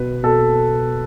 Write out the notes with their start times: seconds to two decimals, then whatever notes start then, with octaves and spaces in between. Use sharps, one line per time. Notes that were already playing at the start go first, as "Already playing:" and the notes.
Already playing: B2 B4
0.23 B2 A4